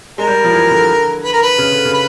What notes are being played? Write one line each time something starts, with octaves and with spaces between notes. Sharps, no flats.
G#3 A#4
G3
F3
E3
D3
B4
A#4
B4
C#3
D3
C#3
B4